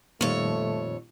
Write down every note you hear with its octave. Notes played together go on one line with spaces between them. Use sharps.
F2 A#2 D#3 G3 A3 C#5